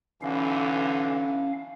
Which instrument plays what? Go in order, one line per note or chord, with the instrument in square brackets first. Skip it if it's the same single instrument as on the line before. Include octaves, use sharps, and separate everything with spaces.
[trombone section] B1 D3 E3 [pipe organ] C#4 F5